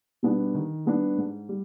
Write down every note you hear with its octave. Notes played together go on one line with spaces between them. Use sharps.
B2 G3 B3 D4
D#3
G3 B3 D4
G#2
G3